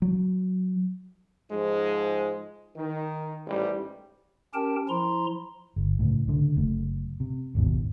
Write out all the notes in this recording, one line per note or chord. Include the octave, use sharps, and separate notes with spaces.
F#3
G#2 F3 G#3
D#3
A1 G#2 G3
C#4 G4 A#4 G5 A5
F3 E4 A#5 C6
G1
C#2 A2
C#2 D3
F#1 A3
C3
G#1 D#2 G#2 B2